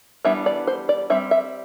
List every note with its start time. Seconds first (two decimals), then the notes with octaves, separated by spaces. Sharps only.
0.25 E3 G3 B3 D4 E5
0.46 D5
0.67 C5
0.89 D5
1.10 G3 C4 E5
1.31 E5